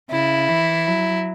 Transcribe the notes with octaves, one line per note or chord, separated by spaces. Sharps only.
C#3 E4
E3
F#3